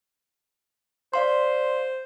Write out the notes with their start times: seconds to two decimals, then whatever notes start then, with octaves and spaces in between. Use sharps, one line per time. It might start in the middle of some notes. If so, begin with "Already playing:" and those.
1.14 C5 D5 F5 C6